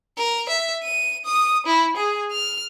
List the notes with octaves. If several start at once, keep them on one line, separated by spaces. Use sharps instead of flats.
A#4
E5
D#7
D#6
E4
G#4
F6